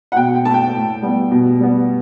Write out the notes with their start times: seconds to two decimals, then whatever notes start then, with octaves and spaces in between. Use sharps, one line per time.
0.12 F#5
0.16 B2 G5
0.35 G5
0.45 A3 A5
0.54 G5
0.74 A2
1.02 G3 B3
1.31 B2
1.60 G3 B3